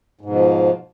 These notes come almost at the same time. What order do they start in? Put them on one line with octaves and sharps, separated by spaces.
G#2 B2 F3